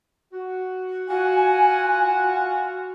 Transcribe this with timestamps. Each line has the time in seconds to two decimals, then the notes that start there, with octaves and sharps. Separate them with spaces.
0.32 F#4
1.09 F4 F#4 G#5